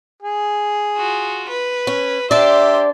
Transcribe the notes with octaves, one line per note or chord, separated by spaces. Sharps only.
G#4
F4 F#4
B4
C#4
D4 G4 C5 D5 E5 C6